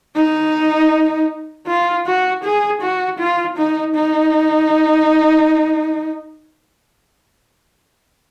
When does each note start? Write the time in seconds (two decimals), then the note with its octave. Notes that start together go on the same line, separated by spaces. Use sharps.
0.16 D#4
1.67 F4
2.06 F#4
2.44 G#4
2.82 F#4
3.19 F4
3.57 D#4
3.95 D#4